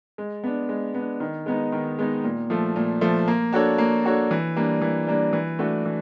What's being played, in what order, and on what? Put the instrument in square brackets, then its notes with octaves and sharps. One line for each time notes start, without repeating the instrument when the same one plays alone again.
[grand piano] G#3
B3 D4
G#3
B3 D4
D#3
G#3 B3 D#4
D#3
G#3 B3 D#4
A#2
F3 A3
A#2
F3 A3
A#3
D4 F#4 A4 C#5
A#3
D4 F#4 A4 C#5
E3
G3 A#3 D4
E3
G3 A#3 D4
E3
A3 D4 F#4
E3